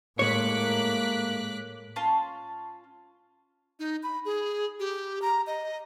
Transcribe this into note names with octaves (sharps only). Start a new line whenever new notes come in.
A2 G#3 A#3 C#5 D6 F#6 B6
C#4 F4 A5 C6
D#4
B5
G#4
G4
A#5
D#5